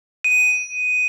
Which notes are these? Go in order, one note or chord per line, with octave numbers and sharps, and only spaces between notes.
D#7